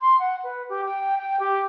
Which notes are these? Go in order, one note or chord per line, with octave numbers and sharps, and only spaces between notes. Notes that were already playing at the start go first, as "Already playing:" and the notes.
C6
F#5
B4
G4
G5
G5
G4